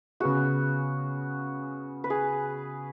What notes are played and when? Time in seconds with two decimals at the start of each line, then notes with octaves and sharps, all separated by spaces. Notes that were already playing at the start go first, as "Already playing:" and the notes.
0.20 C#3 B3 F#4 G#4
2.04 B4
2.10 G#4